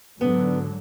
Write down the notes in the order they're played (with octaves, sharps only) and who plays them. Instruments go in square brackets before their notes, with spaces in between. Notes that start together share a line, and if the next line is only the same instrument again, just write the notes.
[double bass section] G#2 D3 F#3 [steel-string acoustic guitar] B3 D4